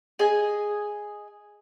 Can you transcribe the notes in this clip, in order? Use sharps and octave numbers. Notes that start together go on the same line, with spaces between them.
G#4 D#5 G#5